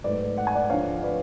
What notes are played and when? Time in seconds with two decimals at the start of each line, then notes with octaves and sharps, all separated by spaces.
0.04 G#2 F#3 A3 B4 D5
0.38 F#5
0.47 G#5
0.55 D5 F#5
0.70 D2 D3 F3 C#5 F5
1.03 B4 D5